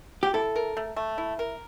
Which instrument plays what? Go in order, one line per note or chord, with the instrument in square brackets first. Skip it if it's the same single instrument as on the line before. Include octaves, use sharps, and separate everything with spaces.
[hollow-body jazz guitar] G4
[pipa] E4 [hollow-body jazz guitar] A4
[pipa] A#4
A3
A3
E4
A#4